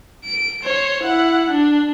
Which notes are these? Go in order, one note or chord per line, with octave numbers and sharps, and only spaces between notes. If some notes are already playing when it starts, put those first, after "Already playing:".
D7
C5 C#5
E4 F#5
D4